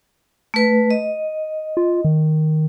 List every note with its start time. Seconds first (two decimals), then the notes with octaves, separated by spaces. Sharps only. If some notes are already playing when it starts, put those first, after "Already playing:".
0.54 A3 B4
0.91 D#5
1.77 F4
2.05 D#3